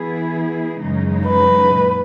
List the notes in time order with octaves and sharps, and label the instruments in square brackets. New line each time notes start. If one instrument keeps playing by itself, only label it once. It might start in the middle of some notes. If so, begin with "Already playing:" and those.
Already playing: [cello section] E3 B3 E4 G#4
F#2 C#3 E3 G#3 D#4
[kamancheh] B4
[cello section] A#2